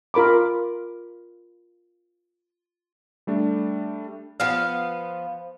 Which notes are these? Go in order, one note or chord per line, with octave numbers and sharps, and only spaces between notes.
F4 A#4 B5 D6
G3 A3 D4
F3 B3 F5